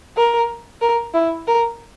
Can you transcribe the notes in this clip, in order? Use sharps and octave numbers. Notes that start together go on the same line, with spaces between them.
A#4
A#4
E4
A#4